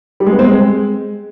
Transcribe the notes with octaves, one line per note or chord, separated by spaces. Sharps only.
G3
G#3
B3
C4
G#3